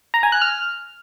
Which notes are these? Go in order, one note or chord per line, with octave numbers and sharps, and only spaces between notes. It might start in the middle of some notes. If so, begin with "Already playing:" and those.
A#5
G#5
F#6
F6